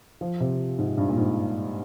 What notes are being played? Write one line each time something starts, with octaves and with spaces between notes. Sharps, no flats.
F3
C3
G#2
G2
A#2
G#2